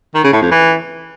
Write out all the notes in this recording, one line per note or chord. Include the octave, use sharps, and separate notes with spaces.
D#3
C#3
A2
F2
E3